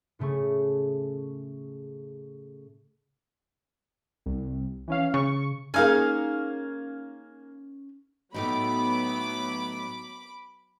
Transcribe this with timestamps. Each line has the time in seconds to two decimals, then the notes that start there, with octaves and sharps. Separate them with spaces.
0.19 A2 C#3 A3 G#4 C#6
4.26 C2
4.88 E3 C#4 F5
5.14 C#3 C#6
5.74 A#3 C#4 D#4 G#4 F5 G#5
8.34 A2 F#3 A3 B3 D#4 B5 D6